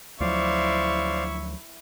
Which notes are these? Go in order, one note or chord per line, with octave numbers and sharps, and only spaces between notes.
D2 F3 F#3 E4 C5 D5 F5 C#6